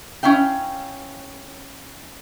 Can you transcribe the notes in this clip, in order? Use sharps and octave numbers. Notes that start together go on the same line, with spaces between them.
C#4 E4 F5 G5